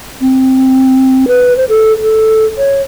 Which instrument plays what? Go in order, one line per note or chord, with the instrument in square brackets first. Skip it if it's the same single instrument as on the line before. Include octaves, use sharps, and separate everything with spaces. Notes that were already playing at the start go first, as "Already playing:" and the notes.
[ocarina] C4
B4
C5
A4
A4
C#5